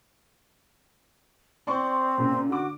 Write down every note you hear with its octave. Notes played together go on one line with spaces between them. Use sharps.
C4 D5 C6 C#6
F#2 A#2 C#3
D3 F#4 D6